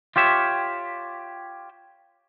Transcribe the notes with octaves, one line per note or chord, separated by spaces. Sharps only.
F4 G4 C#5 E5